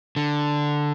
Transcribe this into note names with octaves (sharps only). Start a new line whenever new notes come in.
D3